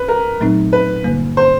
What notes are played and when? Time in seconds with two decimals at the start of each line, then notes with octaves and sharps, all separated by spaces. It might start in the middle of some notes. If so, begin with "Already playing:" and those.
Already playing: B4
0.08 A#4
0.40 A#2 F#3 A3 C4 D#4
0.73 B4
1.04 G2 D3 G3 A#3
1.37 C5